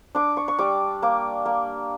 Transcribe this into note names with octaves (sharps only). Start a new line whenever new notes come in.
D4 D6
C#6
C#6
G3 D6
A#3 D6
A#3